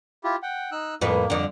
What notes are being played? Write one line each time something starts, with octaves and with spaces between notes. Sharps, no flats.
E4 F4 G4
F#5 G5
D#4 E6 F#6
F2 A2 A#3 B4
F2 D3